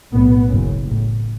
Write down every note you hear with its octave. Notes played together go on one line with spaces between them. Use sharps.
B1 A2 B3
F#1 F#2 C#3
A1 A2